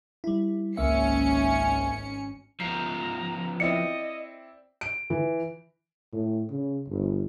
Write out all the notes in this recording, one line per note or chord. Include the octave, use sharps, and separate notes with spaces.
G3 E4
G#1 C#2 A#3 C#4 E5 C#7
F3 B3 A#5 C7
C4 E4 D5 D#5 C#7
D7
E3
A2
C#3
G1